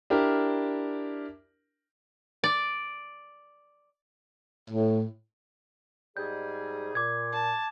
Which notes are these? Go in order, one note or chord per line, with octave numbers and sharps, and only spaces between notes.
D4 E4 G4 A#4
D5
A2
G#2 G3 G#4 G6
A#2 D6 G#6
A5